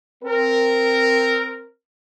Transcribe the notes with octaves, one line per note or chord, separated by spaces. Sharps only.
C4 A#4